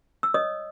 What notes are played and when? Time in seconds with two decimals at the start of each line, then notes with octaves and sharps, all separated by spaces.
0.23 E6
0.34 C#5 D#5 D#6